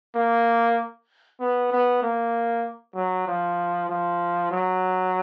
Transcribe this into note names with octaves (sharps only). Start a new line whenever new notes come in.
A#3
B3
B3
A#3
F#3
F3
F3
F#3